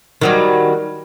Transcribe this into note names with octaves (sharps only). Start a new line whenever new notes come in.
D#3 F#3 G3